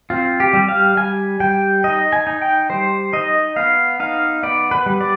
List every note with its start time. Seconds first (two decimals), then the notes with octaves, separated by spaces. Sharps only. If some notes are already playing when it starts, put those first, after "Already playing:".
0.10 C4 F4
0.40 G4
0.53 G3
0.68 F5
0.97 G3 G#5
1.40 G3 G5
1.84 D#4 D#5
2.13 G#5
2.27 D#4
2.42 G5
2.70 G3 C5
3.13 D#4 D#5
3.56 B3 F5
4.00 D#4 F5
4.43 B3 D5
4.71 B4
4.86 G3
5.01 D5